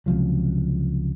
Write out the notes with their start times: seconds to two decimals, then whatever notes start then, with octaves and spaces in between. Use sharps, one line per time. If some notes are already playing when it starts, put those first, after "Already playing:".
0.06 C#2 C3 F3 F#3